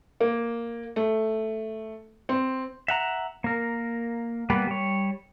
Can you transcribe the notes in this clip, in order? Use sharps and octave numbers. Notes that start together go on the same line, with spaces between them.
A#3
A3
C4
E5 F#5 A#5
A#3 A#4
G3 A#3 B3 B4
G3 C#5